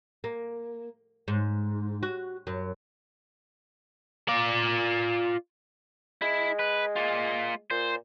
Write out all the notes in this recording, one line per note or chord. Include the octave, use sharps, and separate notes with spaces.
A#3
G#2
F#4
F#2
F4 D5
G#3 E4
B4
A#3 F4
A#2 C5